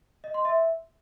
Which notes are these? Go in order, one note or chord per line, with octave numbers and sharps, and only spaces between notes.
D#5
C6
E5